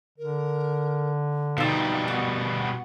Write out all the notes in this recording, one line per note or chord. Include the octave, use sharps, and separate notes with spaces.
D3 A#4
B2 G3 D#4 F4 E6
B3 F#4 F#5